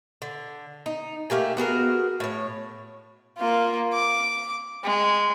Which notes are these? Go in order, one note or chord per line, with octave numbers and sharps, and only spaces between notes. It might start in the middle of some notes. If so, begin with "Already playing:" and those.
D3
D#4
A3 A#3 G4 G#5
B3 F#4 G#4 A#4
A2 C#5
A#3 F4
D6
G#3